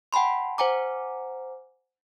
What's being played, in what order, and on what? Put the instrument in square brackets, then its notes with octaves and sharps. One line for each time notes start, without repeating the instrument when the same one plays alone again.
[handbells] F#5 G5 A5 B5 C6
C5 F#5 G#5 A#5 D6